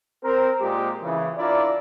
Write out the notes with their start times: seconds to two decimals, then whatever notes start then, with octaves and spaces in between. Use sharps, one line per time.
0.24 C4 A#4 C5
0.61 A#2 G#3 G4
1.02 C#3 E3
1.37 D4 E4 F4 A#4 D5